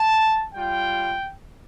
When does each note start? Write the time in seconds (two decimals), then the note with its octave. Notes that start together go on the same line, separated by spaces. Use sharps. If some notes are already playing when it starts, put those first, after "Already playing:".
Already playing: A5
0.54 G3 F4 G5